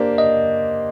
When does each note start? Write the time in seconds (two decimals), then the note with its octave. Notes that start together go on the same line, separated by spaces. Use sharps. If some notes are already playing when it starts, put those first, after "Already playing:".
Already playing: A#3 D4 G4 C5 D5
0.18 D#5